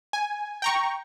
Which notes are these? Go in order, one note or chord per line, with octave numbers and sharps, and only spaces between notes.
G#5
G5 A#5 C#6